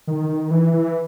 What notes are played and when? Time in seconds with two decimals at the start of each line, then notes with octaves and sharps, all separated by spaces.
0.07 D#3
0.29 D#3
0.51 E3
0.73 E3